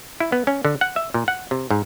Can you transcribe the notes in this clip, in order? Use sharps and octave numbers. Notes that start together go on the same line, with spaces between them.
E4
B3
C#4
D3
F#5
E5
A#2
F#5
C3
G#2